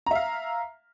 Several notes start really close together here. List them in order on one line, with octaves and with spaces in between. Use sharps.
A#5 E5 F5